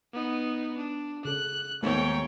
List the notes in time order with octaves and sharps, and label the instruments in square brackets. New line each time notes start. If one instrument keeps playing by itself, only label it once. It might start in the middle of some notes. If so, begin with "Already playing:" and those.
[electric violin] B3 D#4
D4
[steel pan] C#3 A4 [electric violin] F#6
[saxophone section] D#2 G#2 [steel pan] A3 B3 C5 [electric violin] C#5 G5